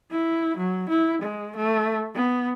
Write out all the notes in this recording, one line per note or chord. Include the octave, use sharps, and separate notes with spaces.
E4
F#3
E4
G#3
A3
B3